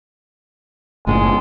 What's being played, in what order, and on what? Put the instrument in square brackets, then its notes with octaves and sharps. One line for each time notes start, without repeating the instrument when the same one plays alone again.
[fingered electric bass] F#1 A2 [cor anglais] G#3